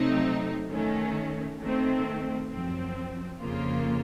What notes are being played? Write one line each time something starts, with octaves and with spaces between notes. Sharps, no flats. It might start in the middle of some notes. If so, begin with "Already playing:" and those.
Already playing: C3 F#3 A3 C4 D#4
D#3 A3 C#4
D#3 A3 C4
F#2 F3 C4
F2 C#3 F3 A#3 F4